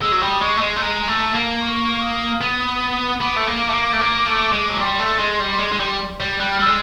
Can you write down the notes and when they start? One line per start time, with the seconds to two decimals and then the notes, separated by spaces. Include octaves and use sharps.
0.01 G#3 E6
0.12 F#3
0.21 G3 D#6
0.41 G#3 C#6
0.57 A3
0.60 G#3 C6
0.76 A3
0.81 G#3 A#5
1.00 A#5
1.07 A3
1.21 A5
1.34 A#3
1.41 A#5
1.60 C#6
2.01 D#6
2.41 B3
3.21 B3 D6
3.36 A3
3.47 A#3
3.68 A3
3.73 A#3
3.92 A3
4.01 A#3
4.26 A3
4.53 G#3
4.70 F#3
4.80 G3 C6
5.00 A3
5.20 G#3
5.40 G3
5.60 G#3
5.72 G#3
5.80 G3
6.20 G3
6.40 G3 F#6
6.51 F6
6.59 G3 E6
6.66 G#3